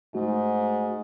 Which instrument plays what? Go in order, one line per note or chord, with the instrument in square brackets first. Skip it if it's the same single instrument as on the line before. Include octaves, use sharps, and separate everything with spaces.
[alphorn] G#2 [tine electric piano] A3 F#4